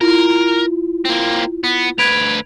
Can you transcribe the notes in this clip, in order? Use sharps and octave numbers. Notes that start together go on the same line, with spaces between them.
E4 F4 A#4
A#3 C4
B3
D2 B4 G#6 D7 F7